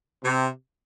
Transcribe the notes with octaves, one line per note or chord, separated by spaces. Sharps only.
C3